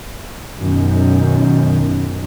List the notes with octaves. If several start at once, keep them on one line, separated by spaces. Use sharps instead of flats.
F#2 B2 D#3